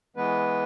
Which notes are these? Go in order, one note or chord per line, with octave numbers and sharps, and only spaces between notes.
E3 G#3 B3 B4